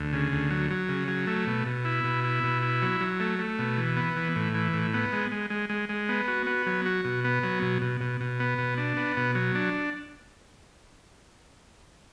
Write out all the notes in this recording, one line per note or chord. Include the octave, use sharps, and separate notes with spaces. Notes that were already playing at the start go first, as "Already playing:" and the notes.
Already playing: D2
C#3
D2
F#3
F#3
C#3
F#3
A3
B2
B2
E4
B2
E4
B2
E4
F#3
F#3
A3
A3
B2
E3
B3
E3
A2
E3
A2
B3
G#3
G#3
G#3
G#3
G#3
B3
F#4
B3
F#3
F#4
B2
B3
F#3
B2
B2
B2
B2
B3
B2
D4
B3
B2
F#3
D4